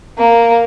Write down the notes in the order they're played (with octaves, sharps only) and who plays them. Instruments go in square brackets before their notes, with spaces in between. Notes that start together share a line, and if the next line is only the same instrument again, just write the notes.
[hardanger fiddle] A#3